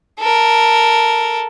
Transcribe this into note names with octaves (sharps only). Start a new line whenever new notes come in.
A4 A#4